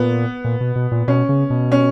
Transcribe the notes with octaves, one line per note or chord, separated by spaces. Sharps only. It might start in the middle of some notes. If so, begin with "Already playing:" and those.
Already playing: A#2 B3
A#2
B2
B2
A#2
B2 C#4
C#3
B2
C#4